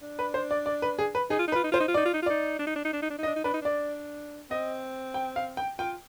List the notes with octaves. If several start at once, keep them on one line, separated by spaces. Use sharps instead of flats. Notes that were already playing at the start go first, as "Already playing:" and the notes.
D4
B4
C5
D5
D5
B4
G#4
B4
D#4 G#4
F4
D#4
B4
F4
D#4
F4 C5
D#4
F4
D#4 D5
F4
D#4
F4
D#4 D5
D4
D#4
D4
D#4
D4
D#4
D4
D#4
D#5
D4
D#4
D4 B4
D#4
D4 D5
C4 D#5
G5
F5
G5
F4 G5